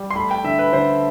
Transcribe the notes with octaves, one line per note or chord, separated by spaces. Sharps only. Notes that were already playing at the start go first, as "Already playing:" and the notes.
Already playing: G3
C6
A3 B5
G5
D3 E5
B4
D3 C5